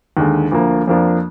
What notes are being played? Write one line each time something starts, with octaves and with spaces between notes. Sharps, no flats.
D#2 D3 G#3
D2 D3 F3 A#3
F2 F3 A#3 D4